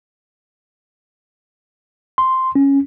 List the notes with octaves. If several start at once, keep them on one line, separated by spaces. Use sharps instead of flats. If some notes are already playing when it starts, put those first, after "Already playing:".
C6
C#4